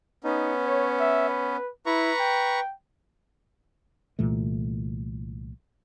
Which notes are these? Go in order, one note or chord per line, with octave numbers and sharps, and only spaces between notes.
B3 C#4 D#4
C#5
E5
B4
E4 B4 A#5 C#6
G5
C2 A#2 E3 A3